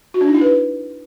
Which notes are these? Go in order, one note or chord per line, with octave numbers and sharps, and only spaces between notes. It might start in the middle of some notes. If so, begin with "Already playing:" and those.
F#4
D4
D#4
E4
B4